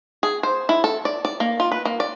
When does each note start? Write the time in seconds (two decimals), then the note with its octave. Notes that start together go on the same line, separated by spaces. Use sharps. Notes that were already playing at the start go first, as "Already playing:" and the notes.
0.23 G#4
0.43 C5
0.69 E4
0.84 A4
1.05 D5
1.25 D5
1.40 A#3
1.60 F4
1.72 B4
1.85 A#3
2.00 D5